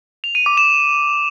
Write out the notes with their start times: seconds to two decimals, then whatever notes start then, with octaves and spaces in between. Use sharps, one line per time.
0.24 F7
0.35 D#7
0.46 D6
0.57 E7